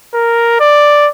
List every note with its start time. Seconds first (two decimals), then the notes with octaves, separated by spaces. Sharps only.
0.14 A#4
0.60 D5